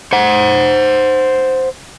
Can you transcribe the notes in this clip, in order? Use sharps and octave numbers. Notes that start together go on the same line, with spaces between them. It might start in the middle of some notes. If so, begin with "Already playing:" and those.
C5 F#5